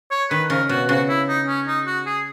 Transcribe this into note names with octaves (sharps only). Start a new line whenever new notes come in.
C#5
D#3 B4
C#3 A#4
B2 F#4
C#3 F#4
E4
D#4
C#4
D#4
F#4
G#4